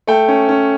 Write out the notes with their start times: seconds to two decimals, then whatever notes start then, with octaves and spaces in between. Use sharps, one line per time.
0.07 A3 G5
0.28 C#4
0.49 C#4